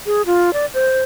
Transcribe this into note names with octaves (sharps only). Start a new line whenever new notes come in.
G#4
F4
D5
C5